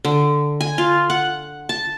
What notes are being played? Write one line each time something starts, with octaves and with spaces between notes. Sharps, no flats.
D3
G#5
F4
F#5
A5